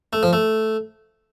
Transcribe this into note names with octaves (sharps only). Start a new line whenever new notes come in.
A3
F3
A3